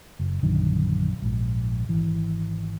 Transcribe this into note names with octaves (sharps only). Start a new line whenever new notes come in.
F#1
A#1 F#2 D3 D#3
A#1 G#2
G#1 E3